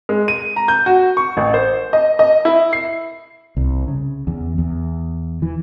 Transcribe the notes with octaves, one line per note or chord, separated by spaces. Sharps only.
G#3
D#7
A#5
G6
F#4
C#6
A1
C5
D#5
D#5
E4
C7
C2
C#3
E2
E2
E3